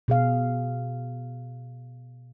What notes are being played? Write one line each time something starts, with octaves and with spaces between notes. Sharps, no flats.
B2 G#4 F5